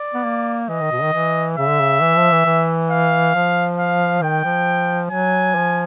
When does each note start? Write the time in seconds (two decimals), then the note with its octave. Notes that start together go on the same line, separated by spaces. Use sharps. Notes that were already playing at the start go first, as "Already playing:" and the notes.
Already playing: D5
0.14 B3
0.25 A#3
0.69 E3 D#5
0.81 D#3
0.91 B2
1.02 D#3
1.13 E3
1.57 C#3 E5
1.69 D3
1.80 C#3
2.02 E3
2.17 F3
2.31 E3
2.46 E3
2.90 F5
3.35 F3
3.78 F5
4.22 D#3 G5
4.45 F3
5.10 F#3 G#5
5.55 F3